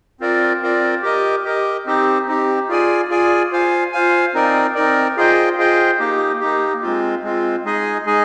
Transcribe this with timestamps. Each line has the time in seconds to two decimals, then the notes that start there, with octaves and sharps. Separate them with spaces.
0.20 C4 F4 A#4 D5
0.61 C4 F4 A#4 D5
1.02 G4 A#4 D#5
1.44 G4 A#4 D#5
1.86 C4 D#4 G4
2.27 C4 D#4 G4
2.68 F4 G#4 D5 G#5
3.10 F4 G#4 D5 G#5
3.51 F4 C5 F5 G#5
3.92 F4 C5 F5 G#5
4.34 C4 D#4 A#4 D5
4.75 C4 D#4 A#4 D5
5.17 F4 G#4 C5 D#5 G5
5.57 F4 G#4 C5 D#5 G5
5.99 A#3 D#4 G4
6.40 A#3 D#4 G4
6.82 G#3 C4 F4
7.23 G#3 C4 F4
7.65 G#3 D#4 G#4 D#5 G#5
8.06 G#3 D#4 G#4 D#5 G#5